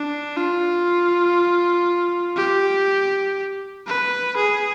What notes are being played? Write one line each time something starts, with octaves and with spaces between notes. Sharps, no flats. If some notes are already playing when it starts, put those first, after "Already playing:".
Already playing: D4
F4
G4
B4
G#4